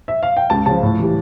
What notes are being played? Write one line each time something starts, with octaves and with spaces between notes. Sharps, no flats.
E5
F5
G5
C#2 A5
C#3 F3 A5
A2
E3 G3